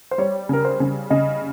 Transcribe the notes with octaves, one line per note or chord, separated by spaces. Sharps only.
C5
G3 C#5
C#3 A#4
C5
C#3
C#3 D#5